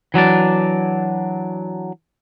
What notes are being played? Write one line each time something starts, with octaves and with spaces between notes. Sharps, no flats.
E3 F#3 D4 D5